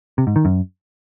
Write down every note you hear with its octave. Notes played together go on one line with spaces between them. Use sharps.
C3
G#2
D#3
F#2